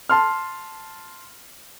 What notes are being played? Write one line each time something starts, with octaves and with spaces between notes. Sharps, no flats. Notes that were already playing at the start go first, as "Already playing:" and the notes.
A5 C6 F6